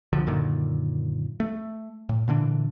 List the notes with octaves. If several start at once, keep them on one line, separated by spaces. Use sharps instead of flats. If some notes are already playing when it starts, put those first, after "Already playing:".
G#1 C#2 D3 F3
F#2 A#2 D3 D#3
A3
A2
A#2 D3 E3 D4